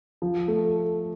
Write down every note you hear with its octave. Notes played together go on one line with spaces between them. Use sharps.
F3
A3